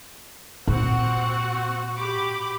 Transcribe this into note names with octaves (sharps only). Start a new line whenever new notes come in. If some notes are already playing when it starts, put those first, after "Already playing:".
A#2 C4 F#4 F#5
G4 B5 D6